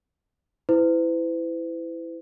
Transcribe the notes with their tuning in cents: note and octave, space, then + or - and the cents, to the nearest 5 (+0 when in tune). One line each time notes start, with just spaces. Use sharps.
E4 +0 B4 +45